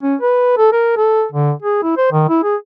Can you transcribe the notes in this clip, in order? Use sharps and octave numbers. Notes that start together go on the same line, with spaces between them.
C#4
B4
A4
A#4
A4
D3
G#4
E4
C5
D#3
E4
G#4